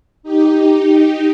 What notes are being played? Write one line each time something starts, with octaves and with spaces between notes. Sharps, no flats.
D#4 G4